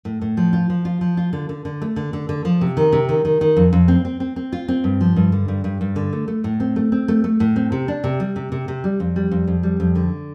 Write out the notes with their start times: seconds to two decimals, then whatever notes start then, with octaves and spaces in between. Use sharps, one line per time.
0.05 A2
0.21 A2
0.37 F3
0.53 F4
0.70 F3
0.85 F4
1.01 F3
1.17 F4
1.33 D3
1.49 D3
1.65 D3
1.82 A3
1.96 D3
2.13 D3
2.29 D3
2.45 F3
2.61 C3
2.77 D#3
2.93 C3
3.09 D#3
3.25 D#3
3.41 D#3
3.57 F2
3.73 F2
3.88 C4
4.05 C4
4.20 C4
4.36 C4
4.52 F4
4.68 C4
4.84 G2
5.01 F3
5.16 G2
5.32 D3
5.48 G2
5.64 G2
5.81 G2
5.96 D3
6.13 A3
6.28 A3
6.44 A2
6.60 C4
6.76 A3
6.92 C4
7.08 A3
7.24 A3
7.40 A2
7.56 C4
7.72 C3
7.88 D4
8.04 C3
8.20 G3
8.36 C3
8.52 C3
8.68 C3
8.84 G3
9.00 F2
9.16 G3
9.32 F2
9.48 F2
9.63 G3
9.80 F2
9.95 D3